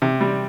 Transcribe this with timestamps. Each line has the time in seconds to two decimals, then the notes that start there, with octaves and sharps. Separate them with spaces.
0.02 C3
0.21 G3